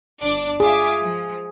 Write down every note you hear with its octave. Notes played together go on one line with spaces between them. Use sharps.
G1 D4 D6
F4 G#4 E5 D6
F3